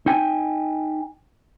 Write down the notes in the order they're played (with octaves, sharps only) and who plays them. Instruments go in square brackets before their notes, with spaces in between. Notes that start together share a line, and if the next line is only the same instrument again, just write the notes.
[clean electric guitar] D#4 G5 G#5